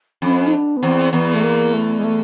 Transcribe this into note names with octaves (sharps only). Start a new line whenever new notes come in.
F2 C#4
C4
C#4
D#4
D4
B3
E2 C4
E2 B3
A3
A#3
A3
G#3
A3